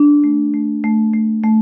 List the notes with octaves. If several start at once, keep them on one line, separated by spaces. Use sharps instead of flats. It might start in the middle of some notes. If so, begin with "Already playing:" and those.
Already playing: D4
A3
A3
A3
A3
A3